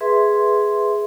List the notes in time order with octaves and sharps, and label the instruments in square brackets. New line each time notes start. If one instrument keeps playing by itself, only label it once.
[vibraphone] G#4 B4 E5 C6